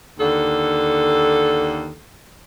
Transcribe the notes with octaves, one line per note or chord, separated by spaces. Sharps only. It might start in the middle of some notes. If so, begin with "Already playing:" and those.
D#2 D3 A4